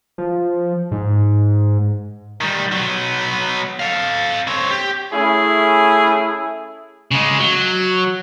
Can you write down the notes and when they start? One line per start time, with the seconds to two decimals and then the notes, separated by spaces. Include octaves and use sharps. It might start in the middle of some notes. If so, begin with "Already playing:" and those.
0.18 F3
0.91 G#2
2.41 D#3 G3
2.72 F#3 B3
3.80 A4 F5
4.47 C4 C#5
4.71 G4
5.13 A3 C#4 E4 G#4 E5
7.11 C#3 G#3
7.40 F#3